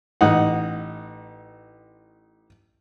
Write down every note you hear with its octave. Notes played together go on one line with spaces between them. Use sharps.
A1 D#4 F#5